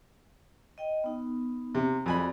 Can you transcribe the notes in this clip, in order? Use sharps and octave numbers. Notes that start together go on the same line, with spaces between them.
D#5 G5
B3 D#4
C3
F2 F#4 G#4 D5 G#5 B5